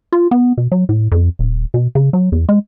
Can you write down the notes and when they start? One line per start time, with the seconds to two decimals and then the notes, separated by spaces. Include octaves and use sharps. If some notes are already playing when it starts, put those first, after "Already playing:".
0.12 F4
0.31 B3
0.58 B2
0.72 F#3
0.89 A2
1.12 F2
1.39 D#1
1.74 B2
1.95 C#3
2.13 F#3
2.32 E2
2.49 G#3